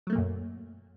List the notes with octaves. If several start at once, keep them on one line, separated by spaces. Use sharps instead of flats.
F#2 A#2 F#3 A3 A#3